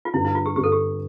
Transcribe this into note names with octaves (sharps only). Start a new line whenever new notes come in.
F4
G2 D3 G3 E4
E4
F4
G4
G2 D3 G3 G4
A4
G4